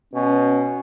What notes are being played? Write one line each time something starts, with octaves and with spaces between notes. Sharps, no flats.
B2 C#4